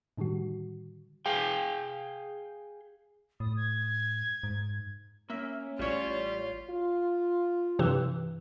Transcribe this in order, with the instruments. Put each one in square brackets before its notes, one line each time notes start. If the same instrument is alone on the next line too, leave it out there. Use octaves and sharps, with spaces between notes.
[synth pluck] A2 D3 D#3 G3 F#4
[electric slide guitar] G#4 F5 G5
[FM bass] A2 [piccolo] D#6
[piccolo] G#6
[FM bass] G#2
[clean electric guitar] A#3 [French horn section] C#4 [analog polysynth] E5
[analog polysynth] A1 C#5 [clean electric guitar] G3 D5 [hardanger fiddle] F4
[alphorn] F4
[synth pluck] G2 C3 E3